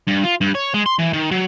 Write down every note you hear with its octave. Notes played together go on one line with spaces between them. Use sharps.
G2
F4
G2
C#5
G#3
C6
E3
D#3
F#3